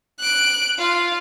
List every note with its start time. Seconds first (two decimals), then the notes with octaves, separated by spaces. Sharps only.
0.19 F#6 D7
0.78 F4